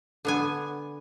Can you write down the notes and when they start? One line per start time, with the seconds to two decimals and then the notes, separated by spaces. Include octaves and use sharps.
0.25 D3 B3 G#5